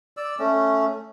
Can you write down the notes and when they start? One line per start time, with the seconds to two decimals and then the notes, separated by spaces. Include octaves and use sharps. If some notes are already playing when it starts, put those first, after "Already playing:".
0.17 D5 E6
0.39 A3 C#4